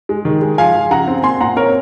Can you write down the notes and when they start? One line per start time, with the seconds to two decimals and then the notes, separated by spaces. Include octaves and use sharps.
0.09 G#3
0.25 D#3
0.42 G#3
0.58 F3 F5 G#5
0.75 F3
0.91 C#3 F#5 A#5
1.08 C4
1.23 A#2 G#5 C6
1.40 A#2 F#5 A#5
1.56 C4 A#4 C#5